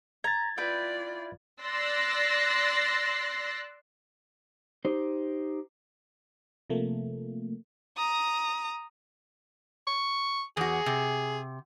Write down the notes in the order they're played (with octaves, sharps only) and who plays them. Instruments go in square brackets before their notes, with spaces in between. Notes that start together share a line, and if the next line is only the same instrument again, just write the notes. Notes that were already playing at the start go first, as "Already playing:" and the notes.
[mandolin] A#5 [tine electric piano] G#6 A6
[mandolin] E4 B4 G5 [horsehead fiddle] F4 D5
[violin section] D5 C6 E6 F#6 A6 A#6
[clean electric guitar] D#4 G4 C5
[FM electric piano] C3 F3 A3 A#3
[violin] A#5 D#6
[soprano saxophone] C#6
[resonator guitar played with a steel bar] E2 F#4 [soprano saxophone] G#4
[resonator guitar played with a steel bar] C3